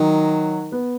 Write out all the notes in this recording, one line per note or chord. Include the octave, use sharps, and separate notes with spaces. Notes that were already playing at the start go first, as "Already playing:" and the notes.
Already playing: D#3 F#3
B3